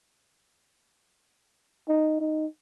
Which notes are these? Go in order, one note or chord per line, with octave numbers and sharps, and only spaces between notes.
D#4
D#4